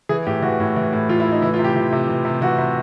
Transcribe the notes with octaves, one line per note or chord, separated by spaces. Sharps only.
E3 G#4
A2 G4
E3 F#4
A2
E3
A2
E3 F4
E4
A2
D#4
E3 E4
F4
C3
G4
E3
C3
E3
C3
E3 F#4
C3